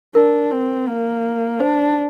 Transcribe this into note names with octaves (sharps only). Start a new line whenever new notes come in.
D4 A#4
C4
A#3
D4 C5